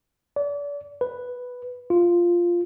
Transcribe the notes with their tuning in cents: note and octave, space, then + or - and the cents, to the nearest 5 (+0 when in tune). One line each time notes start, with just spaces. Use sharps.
D5 -35
B4 +0
F4 -5